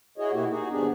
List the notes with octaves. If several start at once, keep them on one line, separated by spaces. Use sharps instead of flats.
E4 F#4 G#4 C#5 D#5
B2 A#3 E4 F#4 G4
D#4 F#4 G#4
D#2 G#2 B3 D4 G4 G#4